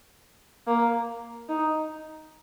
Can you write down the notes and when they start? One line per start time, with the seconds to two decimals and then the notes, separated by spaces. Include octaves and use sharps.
0.67 A#3
1.49 D#4